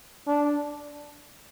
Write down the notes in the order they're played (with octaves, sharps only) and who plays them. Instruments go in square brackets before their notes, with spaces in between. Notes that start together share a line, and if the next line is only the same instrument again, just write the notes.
[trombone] D4